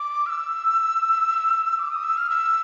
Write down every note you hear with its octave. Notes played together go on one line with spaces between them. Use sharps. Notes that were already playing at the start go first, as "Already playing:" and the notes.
Already playing: D6
F6
E6
D6
D#6
E6
F6
E6